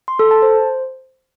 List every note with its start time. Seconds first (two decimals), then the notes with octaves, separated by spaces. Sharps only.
0.08 C6
0.19 A4
0.31 A5
0.42 C5